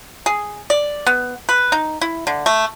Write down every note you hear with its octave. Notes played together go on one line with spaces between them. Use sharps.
G#4
D5
B3
B4
D#4
E4
D3
A3